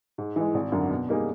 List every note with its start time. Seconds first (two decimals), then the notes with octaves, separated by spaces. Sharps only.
0.18 G#2
0.36 E3 G#3
0.54 G#1
0.72 F#2 D3 F#3
0.91 B2
1.09 G3 A#3 D#4 G#4